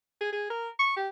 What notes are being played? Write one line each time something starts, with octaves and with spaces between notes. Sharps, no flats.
G#4
G#4
A#4
C#6
G4